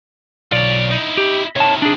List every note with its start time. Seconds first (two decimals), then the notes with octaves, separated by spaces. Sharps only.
0.52 B1 F4 C#5 D5
0.91 D#4 E4
1.17 G4
1.56 C3 D#3 C#5 A5
1.82 D4 G#4